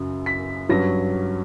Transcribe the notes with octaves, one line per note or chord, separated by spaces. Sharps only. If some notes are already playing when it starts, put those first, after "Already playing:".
Already playing: F#2 C#3 F#3
B6
G2 F#3 C#4 A#6